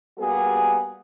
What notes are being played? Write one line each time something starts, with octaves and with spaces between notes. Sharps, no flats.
G3 A#3 B3 F#4 G#4